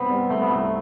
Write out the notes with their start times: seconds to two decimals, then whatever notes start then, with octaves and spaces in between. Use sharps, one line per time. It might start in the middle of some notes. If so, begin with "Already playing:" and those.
Already playing: G2 C3 B3 C4
0.10 G3
0.30 A3 C4
0.42 B3
0.51 C2 A3